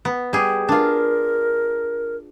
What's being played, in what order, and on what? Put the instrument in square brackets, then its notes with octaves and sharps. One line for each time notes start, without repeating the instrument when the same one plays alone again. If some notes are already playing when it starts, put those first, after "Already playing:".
[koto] B3
G3 G#4
[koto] D4 F4 [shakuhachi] A#4